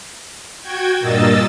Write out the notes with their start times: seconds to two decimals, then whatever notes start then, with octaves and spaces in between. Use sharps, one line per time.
0.62 F#4 G5 G#6
1.00 G2 A#2 A#3 D#5 E6 A6